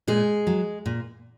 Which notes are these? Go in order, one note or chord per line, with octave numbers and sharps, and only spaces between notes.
A#2 G#3 G#4
F#3
A#2